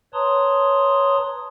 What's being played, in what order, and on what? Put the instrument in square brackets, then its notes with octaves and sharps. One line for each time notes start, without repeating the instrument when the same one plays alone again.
[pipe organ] B4 C#5 A5 A#5 C6 D#6